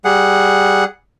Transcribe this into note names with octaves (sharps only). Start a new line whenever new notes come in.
G3 G#4 F#5